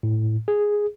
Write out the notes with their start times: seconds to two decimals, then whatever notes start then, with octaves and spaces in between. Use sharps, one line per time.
0.03 A2
0.48 G#4